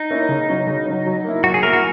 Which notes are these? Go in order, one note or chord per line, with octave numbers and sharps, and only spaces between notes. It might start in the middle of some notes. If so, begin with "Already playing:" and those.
Already playing: D#4
A#3 C#4 E4
C#3
F#3 C#4
C#3
F#3 C#4
F#3
A#3 E4
F#3 F#4
G#4
A#3 E4 A#4
F#4